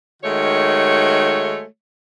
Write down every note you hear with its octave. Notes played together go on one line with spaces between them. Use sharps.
D#3 G#3 A3 F#4 C#5